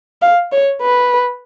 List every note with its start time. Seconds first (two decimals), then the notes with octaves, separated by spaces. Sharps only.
0.22 F5
0.52 C#5
0.82 B4